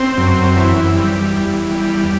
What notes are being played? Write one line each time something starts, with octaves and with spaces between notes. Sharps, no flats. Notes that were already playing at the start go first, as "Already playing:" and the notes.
Already playing: C4
F#2
E3
G3
E2
G3